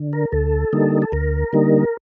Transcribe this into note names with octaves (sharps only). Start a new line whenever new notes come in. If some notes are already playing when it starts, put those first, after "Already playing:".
Already playing: D3
A#4
D2 A4
D3 G3 A#3 D#4
A4
D2 A#4
D3 G3 A#3 D#4